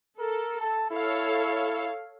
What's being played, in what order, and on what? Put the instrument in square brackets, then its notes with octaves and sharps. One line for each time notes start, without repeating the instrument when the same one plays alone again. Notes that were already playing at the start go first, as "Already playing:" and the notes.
[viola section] A4 [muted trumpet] A#4
[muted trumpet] A5
[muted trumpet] E4 [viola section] A4 C#5 F5